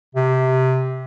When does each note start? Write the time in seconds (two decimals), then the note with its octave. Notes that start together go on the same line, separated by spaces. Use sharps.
0.15 C3